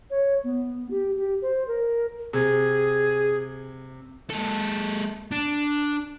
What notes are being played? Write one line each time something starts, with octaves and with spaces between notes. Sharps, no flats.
C#5
B3
G4
G4
C5
A#4
C3 G#4
G#3 A4
D4